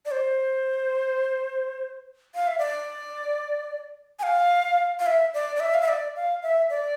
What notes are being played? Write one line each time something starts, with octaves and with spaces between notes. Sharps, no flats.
D5
C5
F5
E5
D5
G#5
F5
F5
E5
D5
D5
E5
F5
E5
D5
F5
E5
D5